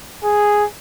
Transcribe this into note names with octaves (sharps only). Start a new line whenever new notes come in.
G#4